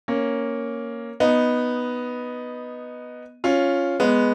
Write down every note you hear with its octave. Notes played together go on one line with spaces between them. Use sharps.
A#3 C#4
B3 D#4
C#4 F4
G#3 B3